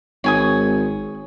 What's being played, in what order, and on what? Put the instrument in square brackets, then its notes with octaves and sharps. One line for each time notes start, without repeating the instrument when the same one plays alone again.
[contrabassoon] G#1 [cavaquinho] C#5 G#5 D#6